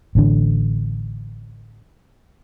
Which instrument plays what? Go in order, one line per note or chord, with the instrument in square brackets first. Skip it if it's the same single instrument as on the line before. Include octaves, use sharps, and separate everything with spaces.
[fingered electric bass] A1 D3